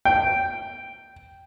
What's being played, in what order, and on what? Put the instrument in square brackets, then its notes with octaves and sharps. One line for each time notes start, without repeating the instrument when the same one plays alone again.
[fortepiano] G5